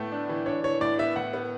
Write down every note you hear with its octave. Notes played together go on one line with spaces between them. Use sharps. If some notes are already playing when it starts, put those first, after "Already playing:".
Already playing: A2 A3 B3
D4
E3
D4 C#5
E3 C#5
A2 D5
B3 E5
A2 F#5
B3